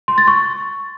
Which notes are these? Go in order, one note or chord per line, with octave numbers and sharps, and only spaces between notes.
C6
A6
C#6